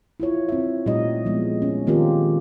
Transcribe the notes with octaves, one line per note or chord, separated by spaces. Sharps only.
E4 F4 C#5
C4 E5
A#2 G3 A3 D#4 G4 D#5
F3 G#3 B3
C#4
D#3 A#3 C4 F4 G4 A#4